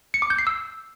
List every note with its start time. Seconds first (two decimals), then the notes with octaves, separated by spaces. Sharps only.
0.14 C#7
0.22 D6
0.30 G6
0.38 C7
0.47 E6